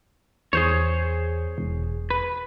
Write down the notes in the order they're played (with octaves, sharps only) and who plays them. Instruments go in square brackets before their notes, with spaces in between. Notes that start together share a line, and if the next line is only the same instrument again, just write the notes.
[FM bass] E2 [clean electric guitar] G#4 C5 C#5
[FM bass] E1
[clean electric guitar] B4